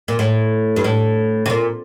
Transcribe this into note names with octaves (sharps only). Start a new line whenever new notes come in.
A#2
A2
G2
A2
C3
A#2